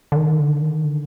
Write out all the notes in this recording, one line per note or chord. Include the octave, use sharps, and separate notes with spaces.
D3
D#3
D3
D#3
D3